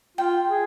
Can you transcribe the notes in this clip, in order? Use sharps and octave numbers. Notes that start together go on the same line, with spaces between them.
F4 G5
G#4